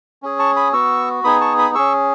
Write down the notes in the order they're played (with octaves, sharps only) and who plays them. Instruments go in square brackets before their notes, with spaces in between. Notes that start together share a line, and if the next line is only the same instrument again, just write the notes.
[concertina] C#4 G#4
A5 C#6
B5 D#6
B3 F#4 C#6 E6
B3 D#4 G#4 B5 D#6
A5 C#6
B5 D#6
C#4 G#4 C#6 E6